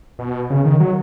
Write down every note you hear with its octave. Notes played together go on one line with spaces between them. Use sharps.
B2
C#3
D#3
F#3